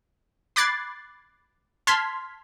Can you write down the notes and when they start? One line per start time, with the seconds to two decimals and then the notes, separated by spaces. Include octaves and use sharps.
0.56 B5 D6 F#6 G#6 A6 C7
1.87 A5 C6 F6 G#6 B6